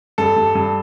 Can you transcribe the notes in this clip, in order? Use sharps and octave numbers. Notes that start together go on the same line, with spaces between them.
G2 A4
G2
G2